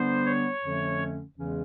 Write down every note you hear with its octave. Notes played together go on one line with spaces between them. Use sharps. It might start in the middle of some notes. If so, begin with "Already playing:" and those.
Already playing: D3 G3 B3 D4 C5
C#5
F2 D3 F3 A3 C#4
E2 C#3 E3 G#3 C#4